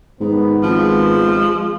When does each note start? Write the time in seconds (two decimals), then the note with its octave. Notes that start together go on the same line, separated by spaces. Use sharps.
0.20 G#2 D#3 B3
0.63 G#1 F3 G#3